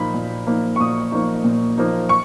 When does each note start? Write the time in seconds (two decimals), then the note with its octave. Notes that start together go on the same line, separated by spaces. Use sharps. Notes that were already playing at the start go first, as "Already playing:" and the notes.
Already playing: A#2 F3 A#3 D#4 B5
0.14 A#2
0.47 F3 A#3 D#4
0.76 C#6
0.80 A#2 D#6
1.12 F3 A#3 D#4
1.44 A#2
1.78 F3 A#3 D#4
2.09 C#6